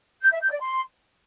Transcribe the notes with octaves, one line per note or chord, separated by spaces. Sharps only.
G6
E5
G6
D5
C6